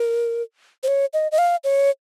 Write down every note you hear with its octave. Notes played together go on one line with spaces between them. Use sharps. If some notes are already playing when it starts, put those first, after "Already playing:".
Already playing: A#4
C5
C#5
D#5
D#5
F5
C#5